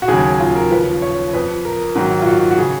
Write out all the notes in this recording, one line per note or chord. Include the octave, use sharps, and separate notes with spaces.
F#4
D#2 C#3 F#3 G#4
F4
A#4
D#2 C#3 F3 B4
C#5
F2 F3 B4
A#4
G#2 D#3 F#3
F4
F#4
F#4
C#3 F3 G#4